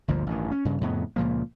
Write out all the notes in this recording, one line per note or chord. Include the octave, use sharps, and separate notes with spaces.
G1 D2 A#2 F3
A1 G2 D#3
C#4
G2 C#3
F2 A2 C#3 B3
C#2 A#2 F3 A#3